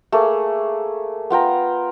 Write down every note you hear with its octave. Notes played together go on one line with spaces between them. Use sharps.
A3 A#3 G#4
B3 F4 G5 A#5